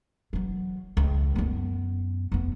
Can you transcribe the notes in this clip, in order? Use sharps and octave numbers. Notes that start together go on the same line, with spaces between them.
E3 F#3
C#2
F#2 B3
E2 B3